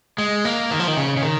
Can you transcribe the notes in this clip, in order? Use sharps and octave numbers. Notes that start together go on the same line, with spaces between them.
G#3
A#3
D#3
F3
D#3
C#3
C#3
D#3